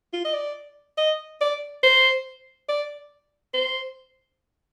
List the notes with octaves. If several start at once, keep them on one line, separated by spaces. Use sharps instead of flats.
F4
D#5
D5
D#5
D5
C5
D5
C5